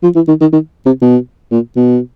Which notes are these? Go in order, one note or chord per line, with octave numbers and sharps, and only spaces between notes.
F3
E3
D#3
D#3
D#3
C3
B2
A#2
B2